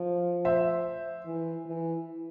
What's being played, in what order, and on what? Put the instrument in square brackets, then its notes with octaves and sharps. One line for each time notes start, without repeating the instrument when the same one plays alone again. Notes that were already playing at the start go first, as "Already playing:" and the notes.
Already playing: [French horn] F3
[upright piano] C5 E5
[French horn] E3
E3